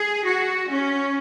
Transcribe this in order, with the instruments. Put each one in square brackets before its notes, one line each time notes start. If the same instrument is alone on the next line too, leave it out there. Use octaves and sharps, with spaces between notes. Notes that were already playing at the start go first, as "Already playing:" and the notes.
Already playing: [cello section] G#4
F#4
C#4